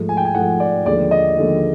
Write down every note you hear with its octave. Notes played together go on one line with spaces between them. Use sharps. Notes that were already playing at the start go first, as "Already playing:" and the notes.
Already playing: G#2 F3 A3
G#5
G5
G#5
G#2 F3 A3 F#5
D5
D#2 D3 F3 G#3 D5
D#5
D#2 D3 F3 G#3